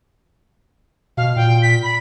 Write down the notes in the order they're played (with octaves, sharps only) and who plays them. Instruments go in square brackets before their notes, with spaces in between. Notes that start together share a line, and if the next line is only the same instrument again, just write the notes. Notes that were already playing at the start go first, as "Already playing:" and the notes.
[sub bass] B2 [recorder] F5
[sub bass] A#2 [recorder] G5
[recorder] B6
B5